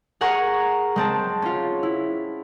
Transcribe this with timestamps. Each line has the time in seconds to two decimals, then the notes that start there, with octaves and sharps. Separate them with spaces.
0.21 G#4 A#4 F#5 G#5 A#5 C#6
0.96 G#3 C4 A5
1.42 C#4 F4
1.83 E4